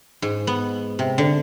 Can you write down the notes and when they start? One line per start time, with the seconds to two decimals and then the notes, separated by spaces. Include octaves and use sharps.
0.22 G#2
0.47 B3
0.99 C3
1.18 D3